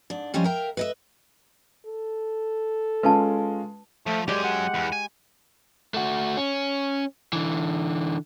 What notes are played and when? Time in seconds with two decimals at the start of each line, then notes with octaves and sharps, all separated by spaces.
0.10 G#2 D4
0.34 F3 G3 C#4 E4 C5 D#5
0.45 A#4 E5 F5 G5
0.77 B4 D#5 E5
1.86 A4
3.03 G#3 C#4 F4 B4 A5
4.06 F3 A3
4.28 F#3 G#3 G4 D5 G#5
4.44 F#5
4.74 E2
4.92 G#5
5.94 A3 F#4
6.37 C#4
7.33 D3 E3